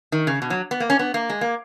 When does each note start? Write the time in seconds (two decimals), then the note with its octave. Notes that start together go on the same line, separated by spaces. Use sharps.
0.12 D#3
0.27 C#3
0.42 B2
0.50 F#3
0.71 B3
0.80 A#3
0.90 C#4
0.99 B3
1.14 A#3
1.30 G#3
1.41 A#3